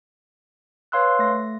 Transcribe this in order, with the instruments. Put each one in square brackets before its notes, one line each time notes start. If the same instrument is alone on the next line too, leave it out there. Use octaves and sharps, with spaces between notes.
[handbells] B4 C#5 F5 C6 E6 F#6
A3 A#6